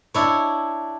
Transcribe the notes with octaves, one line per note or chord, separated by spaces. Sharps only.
D4 E4 C#5